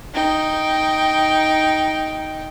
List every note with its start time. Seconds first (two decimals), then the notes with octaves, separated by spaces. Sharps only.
0.15 D#4 G5